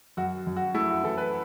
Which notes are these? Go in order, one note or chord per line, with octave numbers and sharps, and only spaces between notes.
F#2 F#4
F#2
F#4
A3 E4
F#4
E3 A4
B4